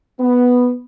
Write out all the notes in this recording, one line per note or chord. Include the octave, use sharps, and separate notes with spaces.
B3